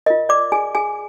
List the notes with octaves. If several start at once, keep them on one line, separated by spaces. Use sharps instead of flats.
F4 A#4 D#5
D5 D6
G#4 G#5
G#4 G#5